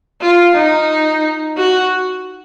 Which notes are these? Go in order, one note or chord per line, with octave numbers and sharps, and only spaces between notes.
F4
D#4
F#4